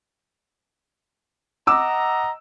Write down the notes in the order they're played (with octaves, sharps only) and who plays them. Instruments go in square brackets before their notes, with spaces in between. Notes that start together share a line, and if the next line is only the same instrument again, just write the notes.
[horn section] D#5 F#5 A#5 [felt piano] D6 E6